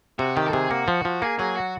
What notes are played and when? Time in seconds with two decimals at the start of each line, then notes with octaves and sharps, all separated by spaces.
0.19 C3 F#4
0.36 D#3 G4
0.47 A4
0.53 C3 G#4
0.71 A#3 F#4
0.88 F3
1.05 F3
1.22 A#3 G#4
1.39 F#3 G#4
1.56 F#4